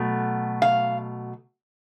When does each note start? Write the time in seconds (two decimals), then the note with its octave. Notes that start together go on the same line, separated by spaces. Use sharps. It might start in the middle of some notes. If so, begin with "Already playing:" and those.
Already playing: B2 F#3 A3
0.62 F5